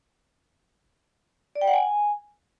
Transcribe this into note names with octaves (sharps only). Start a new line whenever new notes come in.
D5
G5
F#5
G#5